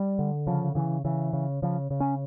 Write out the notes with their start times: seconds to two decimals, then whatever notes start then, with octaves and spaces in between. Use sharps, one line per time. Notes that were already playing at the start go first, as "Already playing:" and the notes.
Already playing: G3
0.19 D3
0.47 C#3 F3
0.75 C#3 E3
1.04 C#3 E3
1.33 C#3
1.62 C#3 F3
1.90 C#3
2.00 C#4